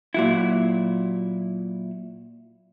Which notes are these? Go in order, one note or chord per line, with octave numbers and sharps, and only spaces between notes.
A#2 F#3 E4